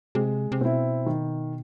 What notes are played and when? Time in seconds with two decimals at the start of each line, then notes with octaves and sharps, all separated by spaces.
0.15 C3 G#3
0.52 C3
0.61 B2 C4 E4
1.06 D#3